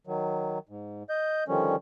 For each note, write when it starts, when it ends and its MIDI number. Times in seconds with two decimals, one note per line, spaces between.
0.07 0.59 51
0.07 0.59 54
0.69 1.03 44
1.10 1.44 75
1.10 1.44 91
1.48 1.76 50
1.48 1.76 51
1.48 1.76 53
1.48 1.76 55
1.48 1.76 61